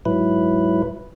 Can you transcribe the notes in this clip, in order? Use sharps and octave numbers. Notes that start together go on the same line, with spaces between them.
G#2 F#3 E4 B4